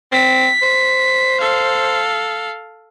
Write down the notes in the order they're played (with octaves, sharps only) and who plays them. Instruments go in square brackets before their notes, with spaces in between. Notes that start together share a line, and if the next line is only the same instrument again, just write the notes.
[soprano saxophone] C4 [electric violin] B6
[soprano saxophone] C5
[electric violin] A4 F5